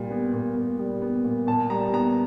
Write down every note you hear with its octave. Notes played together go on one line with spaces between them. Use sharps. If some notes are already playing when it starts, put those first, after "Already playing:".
Already playing: A#2 G3
B3
A#2
A#2
G3
B3
A#2
A#2 A5
G3 A#5
B3 A#5